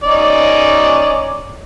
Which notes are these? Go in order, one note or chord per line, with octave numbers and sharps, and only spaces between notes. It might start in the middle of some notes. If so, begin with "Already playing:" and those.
C#4 D#4 D5